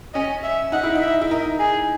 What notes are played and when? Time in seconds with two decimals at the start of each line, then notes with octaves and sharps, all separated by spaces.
0.14 C#4 D#5
0.43 E5
0.72 D#4 F#5
0.83 E4
0.95 D#4
1.01 E5
1.21 E4
1.31 D#4 A#4
1.59 G#4